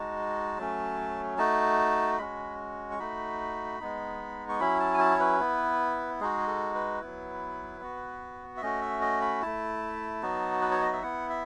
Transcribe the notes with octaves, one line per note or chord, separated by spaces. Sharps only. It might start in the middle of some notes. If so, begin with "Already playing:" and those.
Already playing: G#3 D#4 F#4 A5
F#3 A3 C#4
A3 D#4 F#4 A5
G#3 C#4 F#4 B5
C#6
A3 D#4 F#4 B5
G#3 B3 D#4
C#6
F#3 C#4 E4 B5
A5
G#5
A5
C#5
B4
B3 E4
G#3 D#4 F#4 G#4
A4
B4
F#3 B3 E4
B3 F#4
E5
A3 C#4 F#4 D#5
E5
D#5
B5
A3 E4 A5
F#3 B3 D#4 F#4
B4
C#5
D#5
E5
B3 E4 F#5
E5